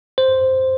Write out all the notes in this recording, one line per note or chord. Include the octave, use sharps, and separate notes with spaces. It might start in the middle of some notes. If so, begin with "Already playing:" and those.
C5